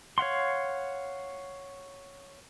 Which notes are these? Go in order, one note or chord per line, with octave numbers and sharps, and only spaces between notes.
C#5 F5 F#5 C6